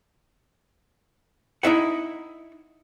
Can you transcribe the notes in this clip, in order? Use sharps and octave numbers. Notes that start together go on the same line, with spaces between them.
D#4 E4 E5 F#5